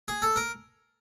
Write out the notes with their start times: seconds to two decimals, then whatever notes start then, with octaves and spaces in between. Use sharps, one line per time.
0.08 G#4
0.22 A4
0.36 A#4